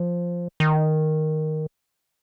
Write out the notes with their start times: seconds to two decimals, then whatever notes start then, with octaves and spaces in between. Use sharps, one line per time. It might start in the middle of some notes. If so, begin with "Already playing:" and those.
Already playing: F3
0.60 D#3